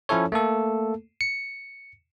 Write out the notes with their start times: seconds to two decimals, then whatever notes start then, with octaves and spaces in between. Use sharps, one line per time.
0.09 F3 C#4 E4 A4 C#5
0.32 A3 A#3 A4
1.21 C#7